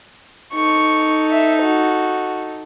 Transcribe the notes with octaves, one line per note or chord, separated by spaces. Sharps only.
D#4 A4 C#6
E5
F#4